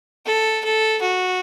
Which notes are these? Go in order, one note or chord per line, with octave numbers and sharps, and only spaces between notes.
A4
A4
F#4